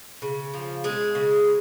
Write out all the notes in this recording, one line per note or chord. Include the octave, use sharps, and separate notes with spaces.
C#3
F3
G#3 G#4
C#3